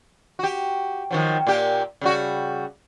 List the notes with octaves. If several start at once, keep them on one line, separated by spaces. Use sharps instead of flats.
F#4 G4
D#3 F3 F#3
A#2 A#3 G4
C#3 G3 F#4